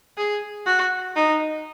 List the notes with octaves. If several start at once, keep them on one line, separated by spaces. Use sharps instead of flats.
G#4
F#4
D#4